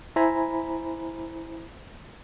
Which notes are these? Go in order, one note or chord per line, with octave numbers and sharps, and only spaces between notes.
E4 C5 G#5 A#5 B5